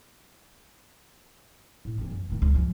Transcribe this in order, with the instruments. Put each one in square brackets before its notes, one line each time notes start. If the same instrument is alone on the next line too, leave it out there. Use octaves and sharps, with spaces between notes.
[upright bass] A2
E3 C4
F#2
D1 D#3
C#2
F#2 F3